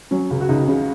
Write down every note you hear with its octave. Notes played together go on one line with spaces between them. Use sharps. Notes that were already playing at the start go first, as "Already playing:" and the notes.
F#3 C#4
C#2
F#4
C#2 D#4
C#3